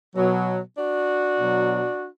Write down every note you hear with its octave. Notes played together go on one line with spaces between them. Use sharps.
B2 F#3
D4 F#4
B2 F#3